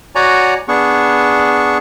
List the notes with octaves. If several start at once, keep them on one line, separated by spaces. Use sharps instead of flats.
F#4 C#5 D5 F#5 G#5 A#5
B3 D4 G#4 C#6